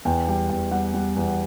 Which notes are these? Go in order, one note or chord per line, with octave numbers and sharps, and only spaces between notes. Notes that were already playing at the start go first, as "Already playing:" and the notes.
E2 G5
G3 G5
E2 G5
G3 F#5
G3
E2